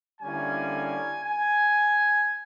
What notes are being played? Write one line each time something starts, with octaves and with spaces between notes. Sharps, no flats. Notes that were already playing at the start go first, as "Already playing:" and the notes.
D3 G3 A#3 C#4 E4 G#5
G#5